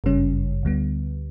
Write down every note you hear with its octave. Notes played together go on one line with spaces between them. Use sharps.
G1 F#2 C#3 G3 C#4
D2 D3 G3 B3